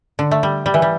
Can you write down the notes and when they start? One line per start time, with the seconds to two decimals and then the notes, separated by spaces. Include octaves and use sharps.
0.19 D3
0.31 A3
0.43 G3
0.66 G3
0.74 E3
0.82 G3